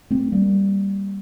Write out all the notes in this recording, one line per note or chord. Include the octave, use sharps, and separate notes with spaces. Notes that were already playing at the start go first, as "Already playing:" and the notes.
A3 C4
G3 A#3